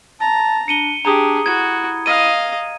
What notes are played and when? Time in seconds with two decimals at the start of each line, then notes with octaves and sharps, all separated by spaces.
0.21 A5 A#5
0.68 D4 C#7 D#7 G7
1.05 D4 G4 G#4 A#5 D#6
1.46 E4 F#4 G#6
2.06 D#5 F5 D#7